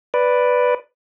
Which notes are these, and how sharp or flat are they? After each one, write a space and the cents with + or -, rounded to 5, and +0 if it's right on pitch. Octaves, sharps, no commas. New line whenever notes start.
B4 +0 D5 +0